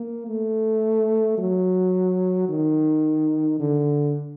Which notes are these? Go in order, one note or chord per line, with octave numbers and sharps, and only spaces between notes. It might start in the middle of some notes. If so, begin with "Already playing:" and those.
Already playing: A#3
A3
F#3
D#3
D3